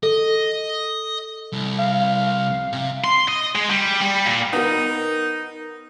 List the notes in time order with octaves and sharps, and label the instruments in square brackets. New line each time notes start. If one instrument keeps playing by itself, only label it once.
[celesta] A4 [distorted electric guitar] D#5
[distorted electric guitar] C2
[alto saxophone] F5
[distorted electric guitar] C3
C6
D#5
G#3
G3
G3
A#2
[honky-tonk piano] B3 A#4 [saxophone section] D#4